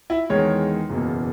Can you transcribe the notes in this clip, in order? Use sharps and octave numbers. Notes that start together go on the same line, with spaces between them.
E4
E2 D#3 G#3 C#5
F#1 E2 B2 A#3